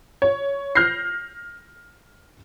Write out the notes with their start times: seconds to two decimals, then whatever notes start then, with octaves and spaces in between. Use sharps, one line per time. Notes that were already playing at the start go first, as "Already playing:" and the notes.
0.22 C#5
0.75 F6 G6 A#6 C7